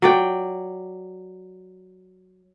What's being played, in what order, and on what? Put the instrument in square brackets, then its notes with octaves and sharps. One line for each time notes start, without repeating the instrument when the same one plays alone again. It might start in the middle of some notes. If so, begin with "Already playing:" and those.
[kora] F#3 D5 G5